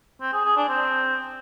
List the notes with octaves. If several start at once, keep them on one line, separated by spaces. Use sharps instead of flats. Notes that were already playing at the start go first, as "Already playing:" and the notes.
C4
G#4
G#4
D4
C4